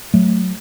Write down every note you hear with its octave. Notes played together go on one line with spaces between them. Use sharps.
F#3 A3